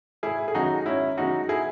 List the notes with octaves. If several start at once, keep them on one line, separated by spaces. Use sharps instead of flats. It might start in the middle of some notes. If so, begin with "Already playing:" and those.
G#1 E4 G#4
G#4
F#2 D#3 G#3 D#4 F#4
G#1 C#4 E4
F#2 D#3 G#3 D#4 F#4
E4 G#4